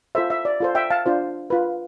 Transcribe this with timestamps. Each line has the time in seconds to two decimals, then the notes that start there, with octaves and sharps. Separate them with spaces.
0.15 F4 A4 C5 E5
0.30 E5
0.45 D5
0.60 F4 A4 C5
0.75 E5 G5
0.90 F5 A5
1.06 D4 F4 C5
1.50 F4 B4